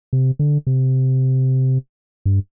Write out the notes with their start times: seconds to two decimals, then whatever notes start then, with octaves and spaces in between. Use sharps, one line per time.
0.13 C3
0.39 D3
0.67 C3
2.26 G2